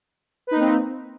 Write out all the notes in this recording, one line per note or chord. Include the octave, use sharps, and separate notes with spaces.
A#3 C4 D#4 B4